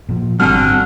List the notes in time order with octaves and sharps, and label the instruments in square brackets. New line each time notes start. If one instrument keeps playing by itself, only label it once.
[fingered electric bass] A#2 F3
[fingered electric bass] G#1 G3 [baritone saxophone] D3 [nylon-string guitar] C4 F#4 G#5 [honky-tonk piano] F6